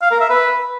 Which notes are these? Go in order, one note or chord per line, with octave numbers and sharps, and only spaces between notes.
F5
A#4
E5
B4